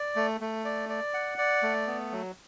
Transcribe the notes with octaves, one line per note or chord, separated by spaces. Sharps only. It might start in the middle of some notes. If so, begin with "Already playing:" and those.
Already playing: D5
A3
A3
D5
D5
F#5
D5
A3
B3
F#3